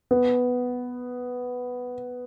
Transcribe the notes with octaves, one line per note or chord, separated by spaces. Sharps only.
B3